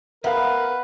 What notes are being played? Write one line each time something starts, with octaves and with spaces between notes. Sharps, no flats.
B3 A#4 B4 E5 F5